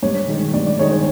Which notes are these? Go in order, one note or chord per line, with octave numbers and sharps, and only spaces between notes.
G2 C#5
D#3 G#3
G2 D5
D5
D#3 G#3 C#5
C#5